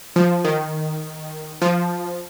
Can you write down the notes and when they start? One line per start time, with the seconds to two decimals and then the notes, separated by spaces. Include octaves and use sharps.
0.16 F3
0.45 D#3
1.62 F3